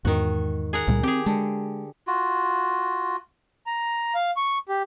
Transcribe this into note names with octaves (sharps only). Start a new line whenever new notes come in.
E2 G#2 D#3 F#4
G#4 A#4 F#5
C#2 A#2 G3
C4 G4 G#4
D3 G#3
F4 F#4
A#5
F5
C#6
G4